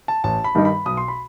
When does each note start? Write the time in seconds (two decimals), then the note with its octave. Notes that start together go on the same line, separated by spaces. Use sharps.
0.08 A5
0.24 A1 A5
0.44 B5
0.55 G2 D#3 G3 D#4
0.65 B5
0.86 B1 D#6
0.97 C6
1.08 B5